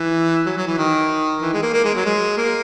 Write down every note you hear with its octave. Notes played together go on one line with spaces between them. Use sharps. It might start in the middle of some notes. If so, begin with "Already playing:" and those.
Already playing: E3
F#3
F#3
E3
D#3
E3
G#3
A#3
A#3
G#3
F#3
G#3
A#3